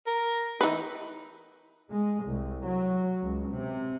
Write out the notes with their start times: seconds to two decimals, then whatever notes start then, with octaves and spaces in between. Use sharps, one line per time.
0.07 A#4
0.61 E3 D#4 B4
1.91 G#3
2.24 C2
2.65 F#3
3.22 C#2
3.53 C3